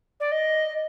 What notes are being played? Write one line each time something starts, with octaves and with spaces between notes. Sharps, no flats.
D5
D#5